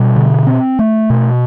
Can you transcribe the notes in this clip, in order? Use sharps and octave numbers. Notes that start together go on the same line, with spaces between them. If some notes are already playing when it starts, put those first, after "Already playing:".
Already playing: B2 G3
D3
C4
A3
B2